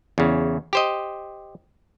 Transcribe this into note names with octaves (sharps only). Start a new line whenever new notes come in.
E2 C#3
G4 C5 D#5